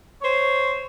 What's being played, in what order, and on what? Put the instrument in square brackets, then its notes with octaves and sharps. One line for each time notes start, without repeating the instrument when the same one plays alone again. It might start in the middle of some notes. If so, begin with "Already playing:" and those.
[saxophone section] C5 C#5